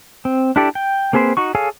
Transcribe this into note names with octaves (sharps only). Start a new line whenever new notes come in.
C4
D4 E4 G4 A4 D5
G5
A#3 C4 G#4 B4 C5
D#4 F#4 C#6
G#4 A4 C#5 F5 G#5